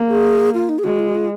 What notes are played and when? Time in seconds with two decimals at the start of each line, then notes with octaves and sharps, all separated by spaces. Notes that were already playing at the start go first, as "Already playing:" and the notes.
Already playing: A#3
0.09 G#4
0.54 F4
0.69 D#4
0.79 G#4
0.84 G#3 F#4
0.99 F4
1.09 F#4
1.15 F4